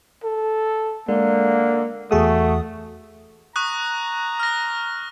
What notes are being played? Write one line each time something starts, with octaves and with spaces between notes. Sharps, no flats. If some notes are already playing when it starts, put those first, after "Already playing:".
A4
D3 G#3 A#3
E2 A3 F#4 G#4 D#6
A#5 C#6 D#6 F#6
F6 A#6